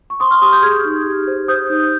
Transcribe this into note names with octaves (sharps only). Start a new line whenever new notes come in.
C#6
C5 C6 D#6
C#6 F6
G4 C6 D#6
D#6 G6
G#4 F6 G#6
D#4
G4
C5
C5 D#6 G6
D#4